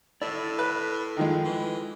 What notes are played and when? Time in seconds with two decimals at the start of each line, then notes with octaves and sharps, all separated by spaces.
0.22 A2 E4 A4 D5
0.59 B4
1.17 D#3 F3 G#3
1.45 E3